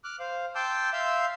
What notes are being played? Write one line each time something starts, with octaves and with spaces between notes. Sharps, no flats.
D6 F6 F#6
C5 F5
G5 A5 C6 D6 E6 G6
E5 F5 C6 E6 G6